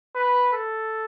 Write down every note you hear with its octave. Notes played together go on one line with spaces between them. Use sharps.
B4
A4